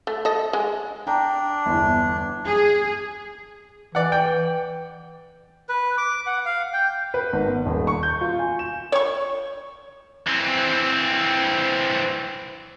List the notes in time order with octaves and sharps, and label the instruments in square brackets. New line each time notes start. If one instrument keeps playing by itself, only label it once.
[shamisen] A3
A4 D#5
G#3
[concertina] D4 [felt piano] G5 A#5
[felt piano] G1 E2
[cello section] G#4
[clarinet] E3 [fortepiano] D5 F#5
[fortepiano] G5
[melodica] B4
D6
F#5
F5
G5
[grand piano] B4
G#1
B3
D#1
C#6
G6
F4
G#5
E7
[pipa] C#5 C#6
[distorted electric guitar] E3 C4